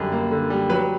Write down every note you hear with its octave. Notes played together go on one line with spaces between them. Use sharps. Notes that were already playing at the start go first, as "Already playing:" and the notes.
Already playing: F#2 D3 G3
A#3
D3
G3
F#3 B4